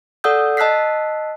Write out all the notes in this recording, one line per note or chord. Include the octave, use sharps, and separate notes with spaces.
A4 D5 F#5 D#6 E6 G6
D#5 A5 E6 F#6 B6 C7